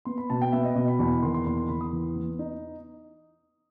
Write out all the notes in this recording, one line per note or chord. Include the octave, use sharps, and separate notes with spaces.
B3 C6
B5
B2 A5
G5
B3 E5
D#5
B2 D#5
B5
E2 B5
B5
D#3 C6
C6
E2 C6
C6
E2 B5
D#6
E3
B3
D#4